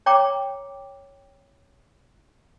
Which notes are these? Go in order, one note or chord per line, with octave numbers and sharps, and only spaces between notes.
C#5 G5 A#5 D6